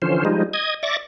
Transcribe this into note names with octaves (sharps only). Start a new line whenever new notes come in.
D3 E3 F3 C#4 C5
F3 G3 G#3 D#4
D#5 D#6 G#6
D5 E5 C#6 D6 A6 A#6